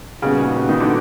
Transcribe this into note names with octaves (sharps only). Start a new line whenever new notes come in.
A#2 C#3 G3 B3 D#4 F#4
D#3
D3